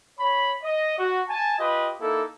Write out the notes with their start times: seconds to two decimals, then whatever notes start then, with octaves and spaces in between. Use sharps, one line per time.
0.20 C#5 B5
0.63 D#5
0.99 F#4
1.29 G#5 A5
1.59 F4 G4 B4 D#5
2.01 A#3 D#4 E4 A4